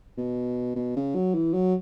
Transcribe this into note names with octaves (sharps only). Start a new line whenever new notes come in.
B2
B2
C#3
F#3
E3
F#3